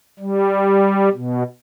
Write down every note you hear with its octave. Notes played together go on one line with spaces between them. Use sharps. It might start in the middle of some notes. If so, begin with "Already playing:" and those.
G3
B2